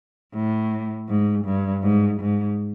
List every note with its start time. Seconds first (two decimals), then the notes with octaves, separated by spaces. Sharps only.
0.33 A2
1.08 G#2
1.45 G2
1.82 G#2
2.19 G#2